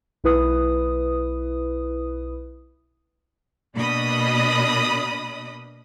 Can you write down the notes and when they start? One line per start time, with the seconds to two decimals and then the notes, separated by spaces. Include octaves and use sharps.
0.24 B1 E4 B4 D#6
3.75 B2 A#3 D4 D#5 B5 D#6